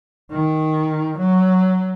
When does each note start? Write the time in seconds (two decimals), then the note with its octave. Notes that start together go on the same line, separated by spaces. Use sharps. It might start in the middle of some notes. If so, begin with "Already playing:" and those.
0.31 D#3
1.19 F#3